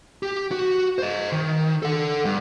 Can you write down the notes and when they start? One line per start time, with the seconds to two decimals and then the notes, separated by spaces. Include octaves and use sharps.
0.23 G4
0.52 F#4
0.98 C5 D#5
1.32 D#3
1.83 A4 F#5
2.25 G2